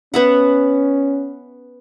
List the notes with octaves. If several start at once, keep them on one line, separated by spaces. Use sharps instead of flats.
B3 C#4 E5 F#5